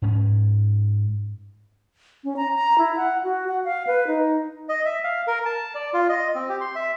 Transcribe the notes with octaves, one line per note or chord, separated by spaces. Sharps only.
G#2 C#4
C#4
A#5
A#5
E4
F#5
F#4
F#5
F5
B4
D#4
D#5
E5
F5
A#4
A5
D5
F4
D#5
C4
G4
C6
E5